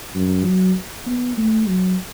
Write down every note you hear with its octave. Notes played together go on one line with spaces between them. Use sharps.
F#2
F#3
B3
A3
F#3